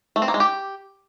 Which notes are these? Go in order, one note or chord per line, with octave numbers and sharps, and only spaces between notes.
A3
C4
A#3
G#3
G4